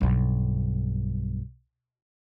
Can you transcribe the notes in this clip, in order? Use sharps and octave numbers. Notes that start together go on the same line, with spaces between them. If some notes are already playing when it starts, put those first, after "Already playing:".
B1 G2